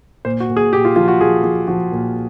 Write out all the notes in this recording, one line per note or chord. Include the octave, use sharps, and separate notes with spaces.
A#2 C5
F#4
A#2
G#4
A#2 G4
F4
F3 F4
F#4
F3 G#4
F3 G#4
F3 F#4
A#2